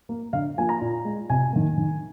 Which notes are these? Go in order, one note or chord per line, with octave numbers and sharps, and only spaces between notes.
A#3
D3 F5
F3 A#3 G#5
A#5
A#2
G#3
C3 G#5
D#3 A#3
D#3